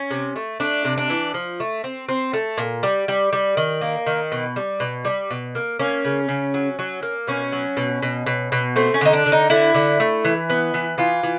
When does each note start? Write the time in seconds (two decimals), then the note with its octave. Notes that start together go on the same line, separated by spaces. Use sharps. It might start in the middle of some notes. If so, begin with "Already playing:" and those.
Already playing: C#4
0.11 C3
0.36 A3
0.60 A3 D4
0.85 C3
0.98 D4
1.10 E3
1.34 F3
1.60 A3
1.84 C4
2.09 C4
2.33 A3
2.58 A#2
2.83 G3
3.08 G3
3.33 G3
3.57 D#3
3.81 A#3
4.07 D#3
4.32 B2
4.56 G3
4.80 B2
5.05 G3
5.31 B2
5.55 A#3
5.79 A#3 C#4
6.05 C#3
6.29 C#3
6.54 F#3
6.79 F#3
7.03 A#3
7.27 B2 C#4
7.52 F#3
7.77 B2
8.02 B2
8.26 B2
8.52 B2
8.76 A3 C4
8.94 C#4
9.01 D3 D#4
9.13 D4
9.26 D3
9.32 D#4
9.50 D3 E4
9.74 D3
10.00 A3
10.25 E3
10.50 B3
10.74 E3
10.98 E3 F4
11.23 E3